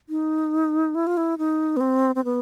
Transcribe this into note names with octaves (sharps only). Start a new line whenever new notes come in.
D#4
E4
F4
E4
D#4
B3
C4
C4
B3